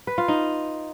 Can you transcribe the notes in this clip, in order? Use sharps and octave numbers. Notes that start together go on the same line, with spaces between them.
B4
F4
D#4